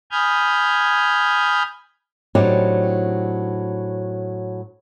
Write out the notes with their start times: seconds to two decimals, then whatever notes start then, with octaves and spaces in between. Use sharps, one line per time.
0.11 G#5 B5 D#6 F6 G6 G#6
2.35 A2 F#3 C4 D4 D#4 G4